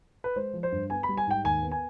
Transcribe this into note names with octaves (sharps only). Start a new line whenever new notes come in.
B4
G#3 C5
F3
C5
G2
B3 G#5
B5
G3
G#5
G#2 G5
D#2 G#5
B3
G#5